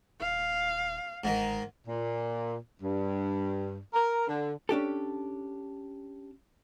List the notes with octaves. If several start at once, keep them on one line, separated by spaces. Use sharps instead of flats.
D#1 F5
G1 G#2 D#3
A#2
G2
A#4
D3
C#4 D4 G4 A4